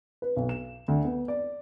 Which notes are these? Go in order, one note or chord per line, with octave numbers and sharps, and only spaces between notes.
B4
B1
E7
D2
B3
D5